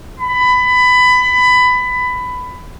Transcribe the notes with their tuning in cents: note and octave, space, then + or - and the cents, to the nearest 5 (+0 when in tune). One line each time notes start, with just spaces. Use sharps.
B5 +20